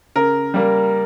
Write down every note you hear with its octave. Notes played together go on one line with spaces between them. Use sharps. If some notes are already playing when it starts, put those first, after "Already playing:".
C#3 A#4
G3 A#3